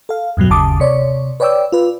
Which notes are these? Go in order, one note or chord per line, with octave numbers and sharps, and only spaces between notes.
A4 F5
E2 G2 B2 F#3
G1 D#2 C#3 A5 D6 D#6
C3 C#5 D5
B4 C#5 D5 G5 D6 E6
F4 B4